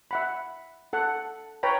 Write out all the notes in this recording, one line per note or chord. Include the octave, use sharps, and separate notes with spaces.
E5 F#5 B5
A4 F#5
B4 C#5 G5 A#5 B5